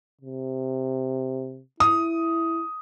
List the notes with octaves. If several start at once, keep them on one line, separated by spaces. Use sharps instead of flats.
C3
E4 D#6